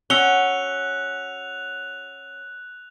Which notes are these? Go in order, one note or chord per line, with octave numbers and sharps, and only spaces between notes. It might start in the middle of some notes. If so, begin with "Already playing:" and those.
C#4 F#4 E6 F#6 C#7 F7 G7